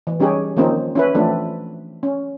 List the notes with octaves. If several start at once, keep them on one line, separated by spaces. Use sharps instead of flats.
E3
G3 C#4 D#4 G4 G#4 C#5
D#3 F3 A#3 C4 C#4 D#4
C#4 E4 B4
E3 F3 A3 C4 D4
C#4